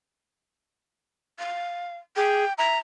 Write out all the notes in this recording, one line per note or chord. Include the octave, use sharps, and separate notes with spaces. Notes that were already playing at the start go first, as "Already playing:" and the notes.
F5
G#4 G5
E5 A#5